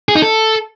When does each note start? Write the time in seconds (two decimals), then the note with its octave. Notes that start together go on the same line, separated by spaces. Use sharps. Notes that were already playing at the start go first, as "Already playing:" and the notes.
0.09 G#4
0.15 D#4
0.22 A4